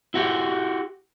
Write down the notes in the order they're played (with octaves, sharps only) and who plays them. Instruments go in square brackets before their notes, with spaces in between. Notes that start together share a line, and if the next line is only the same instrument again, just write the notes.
[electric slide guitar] E4 F#4 G4